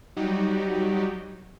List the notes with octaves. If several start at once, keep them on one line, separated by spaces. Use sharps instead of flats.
F#3 G3 D#4 F#4 G4